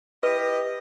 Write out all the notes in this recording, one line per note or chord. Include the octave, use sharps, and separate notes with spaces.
E4 G4 B4 D#5